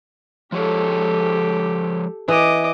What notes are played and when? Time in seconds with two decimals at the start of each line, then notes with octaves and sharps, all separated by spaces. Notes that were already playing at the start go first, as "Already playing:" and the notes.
0.52 F3 G#3 G4 A4 C#5
2.28 E3 D#5 D6